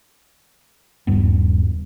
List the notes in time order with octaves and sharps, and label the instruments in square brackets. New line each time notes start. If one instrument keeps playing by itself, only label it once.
[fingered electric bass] D#1 G2 B3